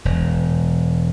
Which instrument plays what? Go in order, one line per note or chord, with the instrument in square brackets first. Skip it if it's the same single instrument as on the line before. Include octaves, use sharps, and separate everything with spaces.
[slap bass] E1